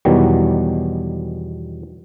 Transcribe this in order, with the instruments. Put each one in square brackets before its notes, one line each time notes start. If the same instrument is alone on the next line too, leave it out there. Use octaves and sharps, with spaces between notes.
[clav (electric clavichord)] E2 B2 D#3 E3 F#3 G3